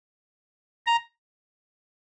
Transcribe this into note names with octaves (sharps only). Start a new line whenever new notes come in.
A#5